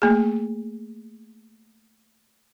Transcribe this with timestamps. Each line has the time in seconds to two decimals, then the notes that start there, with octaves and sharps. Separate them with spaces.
0.02 A3 A#3 G#4